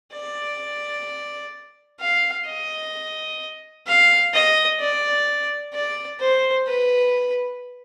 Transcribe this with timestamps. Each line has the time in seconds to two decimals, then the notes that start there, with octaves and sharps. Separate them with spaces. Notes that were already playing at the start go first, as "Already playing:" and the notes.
0.13 D5
2.00 F5
2.47 D#5
3.87 F5
4.33 D#5
4.80 D5
5.73 D5
6.20 C5
6.67 B4